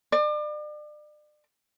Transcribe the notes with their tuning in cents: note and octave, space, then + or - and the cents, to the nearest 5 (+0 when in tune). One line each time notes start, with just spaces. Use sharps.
D5 +35